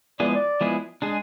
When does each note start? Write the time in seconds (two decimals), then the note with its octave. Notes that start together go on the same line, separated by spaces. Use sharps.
0.20 F3 G#3 B3 E4 G#4 D5
0.34 D5
0.61 F3 G#3 B3 E4 G#4
1.02 G#3 D4 G#4